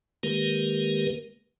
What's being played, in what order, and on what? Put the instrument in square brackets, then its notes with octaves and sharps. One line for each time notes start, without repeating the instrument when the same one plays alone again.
[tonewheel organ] D#3 G#3 A#3 G4 A#4 B4